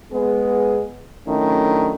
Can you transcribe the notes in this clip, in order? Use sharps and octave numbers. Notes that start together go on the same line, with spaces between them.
G#3 B3 G#4
D#3 F#3 A3 C#4 D4 E4